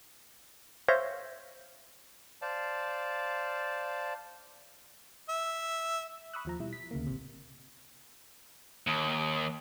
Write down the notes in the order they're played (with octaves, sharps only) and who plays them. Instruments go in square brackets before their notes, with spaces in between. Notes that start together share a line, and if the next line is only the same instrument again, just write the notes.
[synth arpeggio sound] C5 C#5 E5 F5 G6 A#6
[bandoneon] C5 D5 F5 A5
[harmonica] E5
[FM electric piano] B5 C#6 D#6 E6 F#6
D#2 F3 A#5
B2 G3 E4
B6
D2 C#3 A#3
A1 C3
[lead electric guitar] D#2